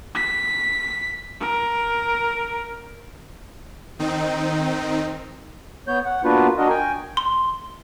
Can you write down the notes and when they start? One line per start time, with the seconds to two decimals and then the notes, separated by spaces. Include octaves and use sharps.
0.15 B6
1.40 A#4
3.99 D#3 C4 D#4
5.88 B3 C#5 G6
6.05 F#5
6.24 A#3 B3 D4 F4 F#4 B4
6.58 D4 F#4 A#4 D#5
6.69 G5 G#5
7.17 C6